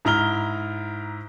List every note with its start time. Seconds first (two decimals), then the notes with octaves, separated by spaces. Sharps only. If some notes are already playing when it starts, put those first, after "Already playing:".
0.05 G#2 E4 A#5 F6 G7